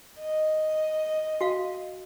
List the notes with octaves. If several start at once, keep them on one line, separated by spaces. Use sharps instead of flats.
D#5
F#4 F5